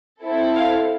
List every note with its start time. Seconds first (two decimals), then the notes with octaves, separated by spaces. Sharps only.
0.24 C4 E4 A4
0.55 F5